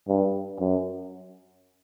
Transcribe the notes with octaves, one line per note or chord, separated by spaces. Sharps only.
G2
F#2